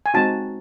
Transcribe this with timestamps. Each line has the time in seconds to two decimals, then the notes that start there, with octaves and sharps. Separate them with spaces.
0.06 G#5
0.14 G#3 C4 D#4 F#4 A5